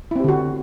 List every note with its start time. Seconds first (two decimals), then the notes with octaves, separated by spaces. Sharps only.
0.11 E4
0.16 C4
0.20 G4
0.24 D3
0.28 F#4